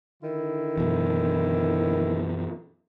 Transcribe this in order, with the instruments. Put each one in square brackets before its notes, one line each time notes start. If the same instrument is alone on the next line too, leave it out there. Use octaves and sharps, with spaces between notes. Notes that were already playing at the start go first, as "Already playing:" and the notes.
[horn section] D3 D#3 E4
[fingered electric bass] F#2 B2 E3